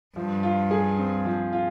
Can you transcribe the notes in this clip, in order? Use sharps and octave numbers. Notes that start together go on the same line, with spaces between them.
G2 F3
F4
G#4
C4
F3
F4